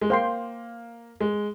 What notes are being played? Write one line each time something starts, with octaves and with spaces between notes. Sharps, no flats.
G#3
A#3 C5 G5 C6
G#3